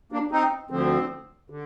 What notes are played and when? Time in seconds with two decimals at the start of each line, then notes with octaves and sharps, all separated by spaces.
0.12 A#3 D4
0.31 C4 D#4
0.70 D2 D3 F3 C4
1.50 D3